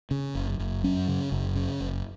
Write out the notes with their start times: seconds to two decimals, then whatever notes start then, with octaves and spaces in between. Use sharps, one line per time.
0.11 C#3
0.35 F#1
0.59 F#1
0.83 F#2 C#4
1.08 C#3
1.32 F#1
1.56 C#3
1.81 F#1